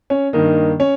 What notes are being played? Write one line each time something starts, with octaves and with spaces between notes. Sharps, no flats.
C#4 C#5
G2 D#3 A#3 D#4 D#5
C#4 C#5